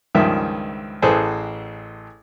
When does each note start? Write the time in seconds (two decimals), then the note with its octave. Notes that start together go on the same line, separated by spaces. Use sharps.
0.15 C#2 G2 D#3 F3 E5
1.02 A1 A2 G#4 A4 B4 C5